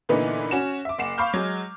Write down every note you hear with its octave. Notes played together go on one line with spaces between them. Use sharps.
A#2 D3 E3 B3 D#4
C#4 F#4 E7
E5 D6
F#1 F#5 C7 E7
F5 B5 C#6 D6 F6 G6
F#3 G#3